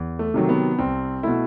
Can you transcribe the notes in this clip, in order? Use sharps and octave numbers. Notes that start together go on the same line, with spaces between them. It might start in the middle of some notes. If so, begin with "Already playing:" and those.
Already playing: E2
A3
C3 D#3 F#3
B3
C2 C4
B2 A3 E4